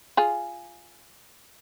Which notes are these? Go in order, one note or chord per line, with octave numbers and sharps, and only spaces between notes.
F4 G#4